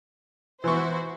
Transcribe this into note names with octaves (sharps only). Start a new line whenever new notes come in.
E3 B3 E4 F#4 C5 C#6